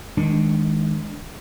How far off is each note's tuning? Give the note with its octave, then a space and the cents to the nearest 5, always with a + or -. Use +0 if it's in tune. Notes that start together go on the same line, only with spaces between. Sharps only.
D#3 +20 G#3 +0 D4 +0